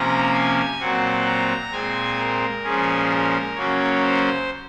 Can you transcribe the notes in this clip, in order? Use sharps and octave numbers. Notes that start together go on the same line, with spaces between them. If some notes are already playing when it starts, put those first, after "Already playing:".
Already playing: C3 F3 A#3 C#4 A#5
G#5
A#2 F#3 C4 F#5
A#5
A#2 G#3 C4 G#5
A#4
A#2 F3 G#3 C#4 G#4
A#4
C#3 F#3 A#3 C#4 C#5
C5